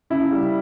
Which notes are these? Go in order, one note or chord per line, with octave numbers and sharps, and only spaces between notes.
C#3 E4
G3